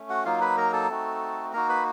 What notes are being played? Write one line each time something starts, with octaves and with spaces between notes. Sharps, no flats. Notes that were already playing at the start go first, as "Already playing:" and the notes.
Already playing: A3 C#4
F#4 F#5
F#3 A#3 D#4 F4 F5
B4 B5
A#4 A#5
A4 A5
A3 C4 D#4 F#4
A#3 D#4 F#4 A#4 A#5
B4 B5